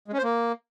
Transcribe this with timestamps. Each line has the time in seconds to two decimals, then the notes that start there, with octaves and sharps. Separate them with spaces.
0.08 G#3
0.13 C#4
0.18 C5
0.23 A#3